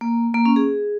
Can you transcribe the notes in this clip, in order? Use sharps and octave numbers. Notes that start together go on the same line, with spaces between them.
A#3
A#3
C#4
G#4